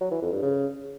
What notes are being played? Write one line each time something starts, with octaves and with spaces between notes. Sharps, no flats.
F#3
E3
F2
G2
C#3